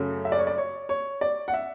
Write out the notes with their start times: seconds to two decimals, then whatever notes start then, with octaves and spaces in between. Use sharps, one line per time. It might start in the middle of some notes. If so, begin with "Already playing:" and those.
Already playing: F#2 C#3 F#3 A3 C#4
0.25 E5
0.32 D5
0.39 C#5
0.47 D5
0.58 C#5
0.89 C#5
1.21 D5
1.48 F#5
1.54 E5